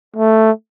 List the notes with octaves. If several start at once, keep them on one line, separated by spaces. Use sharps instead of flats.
A3